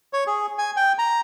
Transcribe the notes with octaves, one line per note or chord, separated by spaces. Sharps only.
C#5
G#4
G#5
G5
A#5